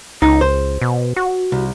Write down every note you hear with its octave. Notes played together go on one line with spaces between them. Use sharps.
C#2 D#4
C5
B2
F#4
C2